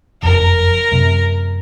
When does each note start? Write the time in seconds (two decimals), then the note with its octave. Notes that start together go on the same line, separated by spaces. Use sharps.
0.22 F#1 F2 A#4
0.92 F#2 C3